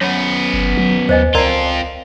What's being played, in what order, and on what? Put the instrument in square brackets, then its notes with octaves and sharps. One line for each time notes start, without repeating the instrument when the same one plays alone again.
[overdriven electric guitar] F#2 B3 [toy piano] C#5
[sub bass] G1
F#3
[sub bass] D#2 [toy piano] C5 D#5 G#5
[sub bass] C#2 [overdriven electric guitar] C4 F4 [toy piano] A#4 D5 A#5